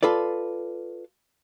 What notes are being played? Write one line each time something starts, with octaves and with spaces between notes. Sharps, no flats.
F4 A4 B4 D5